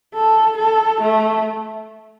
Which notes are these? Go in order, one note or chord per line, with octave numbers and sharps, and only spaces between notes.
A4
A4
A3